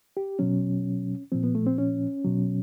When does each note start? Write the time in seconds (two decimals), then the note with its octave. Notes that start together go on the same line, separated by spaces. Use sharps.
0.17 G4
0.39 B2 F#3 C#4
1.32 A#2 F3 C4
1.44 B3
1.55 A3
1.66 C4
1.78 C#4
2.25 B2 F#3